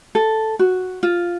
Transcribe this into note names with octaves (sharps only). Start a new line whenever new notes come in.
A4
F#4
F4